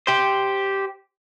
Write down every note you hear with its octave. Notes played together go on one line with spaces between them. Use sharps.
G4 C5